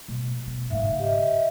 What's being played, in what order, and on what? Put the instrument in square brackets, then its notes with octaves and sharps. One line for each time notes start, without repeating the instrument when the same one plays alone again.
[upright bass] B2
B3
[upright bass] G#2 C#3 [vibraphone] E5 F5
[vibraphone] G4 D#5 E5